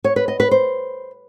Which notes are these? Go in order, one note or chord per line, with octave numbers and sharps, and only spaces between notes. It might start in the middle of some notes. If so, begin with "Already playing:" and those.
C#5
B4
D#5
B4
C5